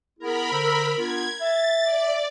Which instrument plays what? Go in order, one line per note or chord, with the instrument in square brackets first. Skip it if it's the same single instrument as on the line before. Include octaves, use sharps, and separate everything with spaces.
[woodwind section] B3 E4 G#4 [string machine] A#4 B5
[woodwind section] D3 C5 E6
[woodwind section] B3 D4 F4 [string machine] G#6
[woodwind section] E5 [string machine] A6
[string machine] D5